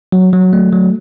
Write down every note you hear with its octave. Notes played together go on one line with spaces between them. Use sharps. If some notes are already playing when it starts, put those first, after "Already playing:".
F#3
F#3
A3
F#3